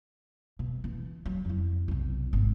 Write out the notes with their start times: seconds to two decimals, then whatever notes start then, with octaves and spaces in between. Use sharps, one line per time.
0.59 B2
0.84 E3
1.26 F#3
1.45 F2 E4
1.88 B1 C3
2.33 G#1